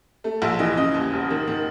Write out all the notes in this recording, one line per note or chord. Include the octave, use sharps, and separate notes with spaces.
A3
A#1 E5
E3 D#5
C#3 D#5
D#2
E1
D#3
D#3